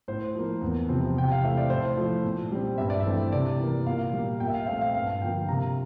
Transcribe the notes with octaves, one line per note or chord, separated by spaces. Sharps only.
A2 C5
F3 A#3
E2
C3 F3 C4
C3 G5
F5
E3 A3 C4 E5
D5
A2 C5
F3 A3
A#2
G3 C4
G2 E5
D5
E5
E3 A3 C4
C3 D5
E3 A#3
A#2 F5
G3 A#3
A#2 G5
E5
F5
A3 C4 F5
F5
G2 F5
D3 F3 A#3 G5
C3 A#5